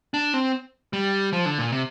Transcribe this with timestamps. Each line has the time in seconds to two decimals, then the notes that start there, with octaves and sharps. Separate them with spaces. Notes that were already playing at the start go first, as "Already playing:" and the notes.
0.14 D4
0.34 C4
0.93 G3
1.33 F3
1.46 D3
1.58 A#2
1.72 C3